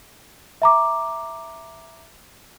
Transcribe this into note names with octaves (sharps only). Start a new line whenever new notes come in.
E5 A#5 D6